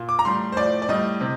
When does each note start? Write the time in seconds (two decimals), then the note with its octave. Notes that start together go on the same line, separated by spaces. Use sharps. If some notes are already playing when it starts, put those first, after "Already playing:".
Already playing: A#2
0.09 D6
0.19 A#5
0.25 A2 G3 C6
0.52 C5
0.57 A2 F3 D5
0.82 D5
0.89 A2 G3 D#5
1.21 C3